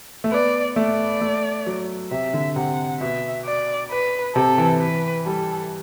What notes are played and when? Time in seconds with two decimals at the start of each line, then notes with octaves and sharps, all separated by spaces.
0.24 A3
0.32 B3 D5
0.76 A3 D5
1.21 A3
1.67 F#3
2.11 C3 E5
2.34 D3
2.56 C3 F#5
3.00 B2 E5
3.46 D5
3.91 B4
4.36 C3 A4
4.58 E3
4.80 B4
5.26 G3 A4